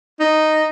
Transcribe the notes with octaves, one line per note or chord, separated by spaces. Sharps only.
D#4